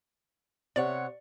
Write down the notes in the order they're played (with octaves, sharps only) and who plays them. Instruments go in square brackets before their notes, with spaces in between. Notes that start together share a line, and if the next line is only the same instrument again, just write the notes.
[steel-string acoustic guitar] C3 C#5 F#5 [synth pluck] D5